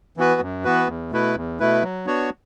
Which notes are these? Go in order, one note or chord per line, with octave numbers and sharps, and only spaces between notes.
E3 B3 F#4 B4
F#2
E3 B3 F#4 B4
E2
B2 A3 E4 B4
E2
B2 A3 E4 B4
F#3
B3 D4 F#4 C#5